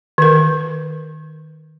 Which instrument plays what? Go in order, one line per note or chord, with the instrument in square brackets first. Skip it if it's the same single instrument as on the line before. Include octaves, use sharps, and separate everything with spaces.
[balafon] D#3 A#4